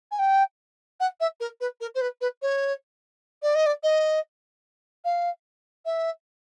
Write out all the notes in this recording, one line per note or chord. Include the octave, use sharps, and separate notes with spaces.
G#5
G5
F#5
E5
A#4
B4
A#4
C5
B4
B4
C#5
D5
D#5
D5
D#5
F5
E5